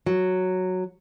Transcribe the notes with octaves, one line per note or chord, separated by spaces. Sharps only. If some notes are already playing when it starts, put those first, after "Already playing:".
F#3